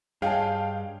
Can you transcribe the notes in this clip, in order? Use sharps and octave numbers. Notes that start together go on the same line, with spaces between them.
G2 G#4 C#5 D#5 F5 G5 A5